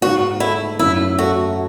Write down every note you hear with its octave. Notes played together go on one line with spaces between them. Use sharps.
G#2 F#4
A3 E4
F#2 E4
A3 F#4